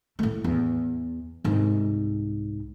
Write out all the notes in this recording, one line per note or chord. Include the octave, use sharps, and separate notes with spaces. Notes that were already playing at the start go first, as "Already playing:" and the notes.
A2 A3
E2
C2 G#2